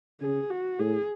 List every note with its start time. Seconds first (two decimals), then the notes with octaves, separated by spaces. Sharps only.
0.21 C#3 G#4
0.50 F#4
0.79 A2 G#4